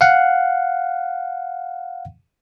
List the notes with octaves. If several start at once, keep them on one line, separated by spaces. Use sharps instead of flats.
F5 F#5